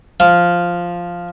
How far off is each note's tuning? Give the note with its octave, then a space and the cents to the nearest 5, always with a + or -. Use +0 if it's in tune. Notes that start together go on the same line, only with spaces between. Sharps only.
F3 +0 F5 +0